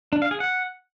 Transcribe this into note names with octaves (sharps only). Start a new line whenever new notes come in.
D4
F5
G#4
F#5